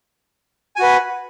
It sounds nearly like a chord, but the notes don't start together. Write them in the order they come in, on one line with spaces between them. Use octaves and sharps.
G#5 F#4 B4